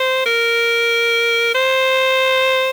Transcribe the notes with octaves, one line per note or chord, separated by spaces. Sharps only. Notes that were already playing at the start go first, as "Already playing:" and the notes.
Already playing: C5
A#4
C5